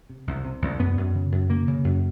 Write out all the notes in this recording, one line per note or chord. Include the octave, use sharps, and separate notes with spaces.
C3
C2
C3
C2
F#2 B3
F#2
C#3
F#2
C#3 A#3
C#3
F#2